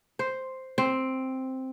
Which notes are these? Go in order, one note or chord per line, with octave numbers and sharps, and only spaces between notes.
C5
C4